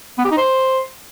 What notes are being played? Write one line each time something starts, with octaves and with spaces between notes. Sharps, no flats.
B3
G4
D#4
C5